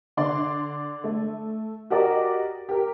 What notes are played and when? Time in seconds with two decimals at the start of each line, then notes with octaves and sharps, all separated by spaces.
0.17 D3 D5 C6
1.04 A3
1.90 F#4 G4 A#4 D5 D#5
2.69 G4 A#4